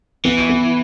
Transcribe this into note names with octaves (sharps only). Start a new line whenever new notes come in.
E3 B3
B3